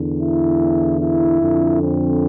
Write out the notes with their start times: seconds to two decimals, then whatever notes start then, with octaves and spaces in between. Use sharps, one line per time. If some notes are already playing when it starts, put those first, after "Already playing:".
Already playing: E2 D3
0.20 E4
0.99 E4
1.40 F2 D3
1.80 C4